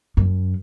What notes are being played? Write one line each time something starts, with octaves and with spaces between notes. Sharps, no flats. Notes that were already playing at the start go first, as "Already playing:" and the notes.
F#2